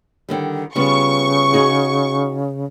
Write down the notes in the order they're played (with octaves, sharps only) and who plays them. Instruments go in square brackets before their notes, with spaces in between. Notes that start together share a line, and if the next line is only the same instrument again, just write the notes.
[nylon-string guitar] D3 D#3 G3
[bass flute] C#3 [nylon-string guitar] G3 B3 F4 [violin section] C#6
[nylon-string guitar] D#4 F#4 G#4